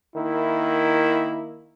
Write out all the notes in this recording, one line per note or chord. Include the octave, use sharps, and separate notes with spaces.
D#3 A#3 E4